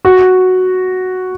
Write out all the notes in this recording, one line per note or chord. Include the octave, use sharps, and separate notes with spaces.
F#4